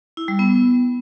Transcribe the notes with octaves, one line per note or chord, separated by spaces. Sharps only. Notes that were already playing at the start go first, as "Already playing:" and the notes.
E4
G3
B3